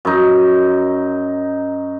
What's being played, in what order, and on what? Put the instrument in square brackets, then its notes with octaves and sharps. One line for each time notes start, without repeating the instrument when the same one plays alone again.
[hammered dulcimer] F#2 D#4